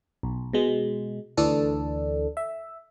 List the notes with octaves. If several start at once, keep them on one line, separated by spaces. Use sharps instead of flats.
B1
B2 G#3
D2 E3 D4 A4
E5